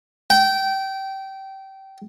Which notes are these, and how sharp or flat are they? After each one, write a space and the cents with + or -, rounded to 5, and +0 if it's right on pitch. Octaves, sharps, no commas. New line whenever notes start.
G5 -20